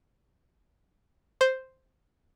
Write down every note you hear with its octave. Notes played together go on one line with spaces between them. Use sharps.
C5